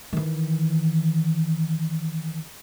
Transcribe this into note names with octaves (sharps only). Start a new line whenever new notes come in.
D#3 E3